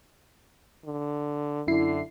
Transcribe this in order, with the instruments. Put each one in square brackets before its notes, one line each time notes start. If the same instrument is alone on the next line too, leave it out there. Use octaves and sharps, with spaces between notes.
[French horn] D3
[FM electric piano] F#2 E4 C7 [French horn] D3